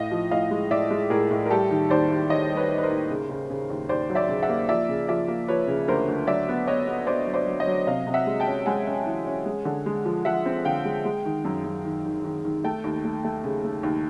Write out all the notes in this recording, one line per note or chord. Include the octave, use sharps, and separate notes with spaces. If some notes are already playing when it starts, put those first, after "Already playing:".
Already playing: A2 D#5 F5
F3
A2 D#5 F5
G#3
A2 D5 E5
G#3
A2 G#4 A#4
A2
A#4
G3 G4 A4
D#3
D#2 C5 D5
D#2
D#3 C#5 D#5
G3
B4 C#5
D#3
B4
A#4 C5
D#2
C#3
C#3
C#3
D#2
D#2 C5 D5
F#3
D5 E5
C#3
E5 F#5
A#3
F3 D5 E5
C#3
F3 D5 E5
A#3
F3 B4 C#5
C#3
D2 A#4 C5
D2
F#3 D5 E5
B3
B3 C#5 D#5
B3
B3 C5 D5
F#3
C5 D5
F#3
C#5 D#5
F#3
C3 D#5 F5
C3
E5 F#5
G#3
G5 A5
C#4
G#3 F#5 G#5
C#4
E3
C#4
G#3
D3
G#3
F3
F3 E5 F#5
C4
D3 F5 G5
G#3
G#3
D#3
F#2
F#2
D#3
D#3
D#3
D#3
A3 G5 A5
D#2
A3
A3
C#3
A3
D#2